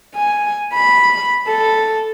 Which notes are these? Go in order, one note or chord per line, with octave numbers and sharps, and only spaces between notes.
G#5
B5
A4